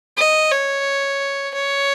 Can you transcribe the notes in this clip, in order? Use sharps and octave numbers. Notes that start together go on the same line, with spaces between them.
D#5
C#5
C#5